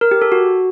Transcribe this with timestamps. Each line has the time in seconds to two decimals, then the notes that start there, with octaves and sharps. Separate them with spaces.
0.01 A#4
0.11 G4
0.22 A4
0.32 F#4